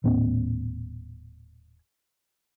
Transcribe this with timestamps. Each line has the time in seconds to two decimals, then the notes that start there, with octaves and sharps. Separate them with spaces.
0.04 D#1 A2 B3 C#4